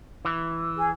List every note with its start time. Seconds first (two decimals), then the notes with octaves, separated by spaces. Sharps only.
0.25 E3
0.76 G#4